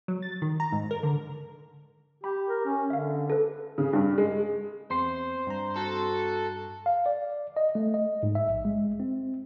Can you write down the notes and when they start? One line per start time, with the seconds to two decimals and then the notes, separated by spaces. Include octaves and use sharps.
0.08 F#3
0.22 A6
0.42 D#3
0.60 A#5
0.72 G#2
0.91 A#4
1.03 D3
2.24 G4 B5
2.49 A#4
2.66 C#4
2.90 D3 E5 F5
3.30 A4 B4
3.78 C#3
3.93 G2
4.18 G#3
4.90 E2 C4 C5 C6 C7
5.47 G2 A#5
5.77 F#4 A4
6.86 F5
7.06 D5
7.57 D#5
7.75 A3
7.94 D#5
8.23 G#2
8.35 E5
8.49 A#1
8.65 G#3
9.00 C4